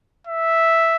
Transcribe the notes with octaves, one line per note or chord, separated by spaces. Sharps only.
E5